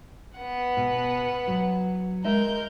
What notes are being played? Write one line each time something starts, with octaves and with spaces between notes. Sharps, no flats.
B3 F#5
B2
F#3
G#3 A#4 D#5 E5 G6